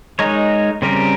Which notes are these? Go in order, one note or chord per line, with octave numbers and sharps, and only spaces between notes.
G#3 D#4 A#4 C#5
C#3 G3 C4 G4 A#4